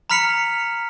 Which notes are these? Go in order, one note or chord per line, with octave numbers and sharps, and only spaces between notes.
A#5 B5 F6 B6 C#7 F7